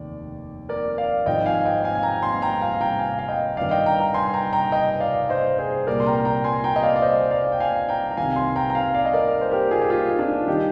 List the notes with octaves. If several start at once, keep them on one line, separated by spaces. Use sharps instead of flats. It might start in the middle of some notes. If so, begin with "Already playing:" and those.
Already playing: F1 D#2 D#3 D5
A#4 D5
D5 F5
G#1 G#2 F3 D#5 G5
F5 G#5
D#5 G5
F5 G#5
G#5
G5 A#5
G#5 C6
G5 A#5
F5 G#5
G5 A#5
F5 G#5
F5
D#5 G5
G1 G2 D#3 D5 F5
D#5 G5
G5 A#5
G5 A#5
G#5 C6
G5 A#5
G5 A#5
D#5 G5
D5 F5
C5 D#5
G#4 C5
C2 A#2 G3 A#4 D5
C6
G5 A#5
G5 A#5
G#5 C6
G5 A#5
D#5
D5 F5
D5
C5 D#5
D5 F5
G5
F5 G#5
G5 A#5
A#5
C2 C3 D#3 F5 G#5
G#5 C6
G5 A#5
A#5
F5 G#5
D5 F5
D#5
A#4 D5
C5
G4 A#4
F4 G#4
G4
F4 G#4
D#4
D4 F4
D#3 G3 D#4 G4